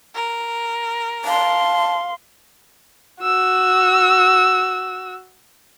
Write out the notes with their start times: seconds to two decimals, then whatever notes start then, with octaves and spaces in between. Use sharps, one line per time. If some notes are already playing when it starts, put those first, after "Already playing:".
0.14 A#4
1.25 F5 A5 C6
3.22 F#4 E6